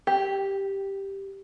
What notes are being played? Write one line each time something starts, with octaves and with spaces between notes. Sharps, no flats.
G4